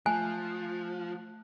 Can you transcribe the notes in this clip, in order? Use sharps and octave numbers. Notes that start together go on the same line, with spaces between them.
F3 A3 G#5 A5 F#6